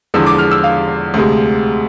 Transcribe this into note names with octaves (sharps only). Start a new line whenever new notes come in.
E2 D3 F3 G#3 E6
D6
F6
E6
F5
D2 C3 G#3